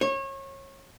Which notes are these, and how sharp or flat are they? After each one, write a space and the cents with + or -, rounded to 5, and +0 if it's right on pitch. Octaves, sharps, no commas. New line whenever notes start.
C#5 -30